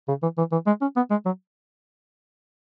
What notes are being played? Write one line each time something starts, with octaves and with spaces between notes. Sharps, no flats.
C#3
E3
E3
E3
G#3
C#4
B3
G#3
F#3